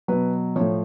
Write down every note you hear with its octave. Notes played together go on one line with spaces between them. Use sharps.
B2 F#3 B4
A2 F3 C#5